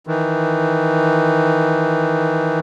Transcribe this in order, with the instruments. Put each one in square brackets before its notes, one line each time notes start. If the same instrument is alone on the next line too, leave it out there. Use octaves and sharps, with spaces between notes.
[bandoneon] D#3 E3